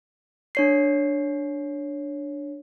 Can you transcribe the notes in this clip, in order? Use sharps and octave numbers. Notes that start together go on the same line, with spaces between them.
D4 C#5 C7